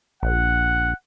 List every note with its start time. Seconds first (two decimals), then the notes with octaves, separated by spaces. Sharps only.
0.23 A#1 F#5